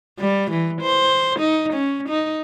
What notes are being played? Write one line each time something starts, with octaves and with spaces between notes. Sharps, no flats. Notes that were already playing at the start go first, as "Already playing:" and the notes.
G3
E3
C5
D#4
C#4
D#4